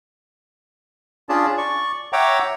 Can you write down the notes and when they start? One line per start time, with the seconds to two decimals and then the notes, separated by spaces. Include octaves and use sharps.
1.29 C#4 D4 F4 G#4 D5 A5
1.58 D5 C#6
2.13 C#5 E5 F#5 G5 A#5 D6